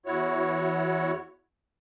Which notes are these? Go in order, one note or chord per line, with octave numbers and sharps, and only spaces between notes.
E2 E4 F#4 C#5